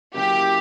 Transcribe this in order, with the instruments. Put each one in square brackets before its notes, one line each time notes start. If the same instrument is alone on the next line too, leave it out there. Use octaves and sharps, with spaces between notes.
[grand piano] C#3 F#3 A#3 C#4 E4 [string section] G4